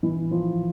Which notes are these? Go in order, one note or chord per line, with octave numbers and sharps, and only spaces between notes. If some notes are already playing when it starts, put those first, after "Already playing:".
E3
F3